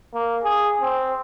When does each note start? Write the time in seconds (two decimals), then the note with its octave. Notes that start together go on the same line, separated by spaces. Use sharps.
0.14 A#3
0.43 G#4
0.81 C4